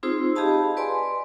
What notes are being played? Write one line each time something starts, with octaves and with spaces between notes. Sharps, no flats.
C4 D#4 F4 G#4 C5 E6
G4 G#4 D#5 F5 A5 B5
B4 D5 G#5 C6